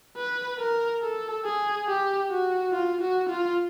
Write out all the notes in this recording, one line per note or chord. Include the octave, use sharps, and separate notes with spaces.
B4
A#4
A4
G#4
G4
F#4
F4
F#4
F4